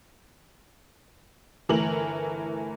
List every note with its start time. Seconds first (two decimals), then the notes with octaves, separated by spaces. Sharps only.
1.69 G1 E3 A3 A#4 F#7